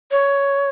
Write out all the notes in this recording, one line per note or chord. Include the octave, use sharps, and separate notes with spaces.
C#5